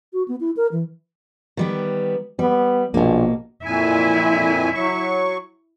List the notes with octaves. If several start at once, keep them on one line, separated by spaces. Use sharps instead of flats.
F#4
B3
E4
A#4
E3
D#3 G3 B3
G3 B3
A#1 B2 A#3
F2 A#2 E4 E5 G#5
F#3 C#6